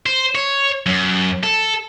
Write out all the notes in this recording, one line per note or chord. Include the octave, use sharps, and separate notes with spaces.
C5
C#5
F#2
A4